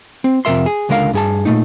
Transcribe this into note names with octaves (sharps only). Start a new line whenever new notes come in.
C4
F2 C3 D#3 A#4 E5 C6
G#4
C#2 D3 G#3 A#4 F5
G2 G#4 A5
A#2 A3 D#4